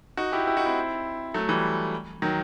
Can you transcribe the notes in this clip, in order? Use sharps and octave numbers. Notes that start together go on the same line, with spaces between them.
D#4 F#4
E4 G4
E4 G4
D#4 F#4
C4 E4
F#3 A3
E3 G3
D#3 F#3